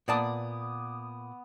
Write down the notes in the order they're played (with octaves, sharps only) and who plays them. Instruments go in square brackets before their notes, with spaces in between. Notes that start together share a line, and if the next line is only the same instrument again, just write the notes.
[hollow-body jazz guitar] A#2 D5 A5 [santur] B3 D6 D#6